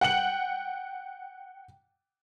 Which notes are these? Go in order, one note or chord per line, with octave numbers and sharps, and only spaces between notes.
F#5 G5 C#7 F#7